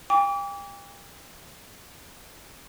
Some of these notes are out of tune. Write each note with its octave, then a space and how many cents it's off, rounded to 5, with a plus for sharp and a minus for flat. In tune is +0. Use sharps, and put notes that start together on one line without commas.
G5 +40 D6 -35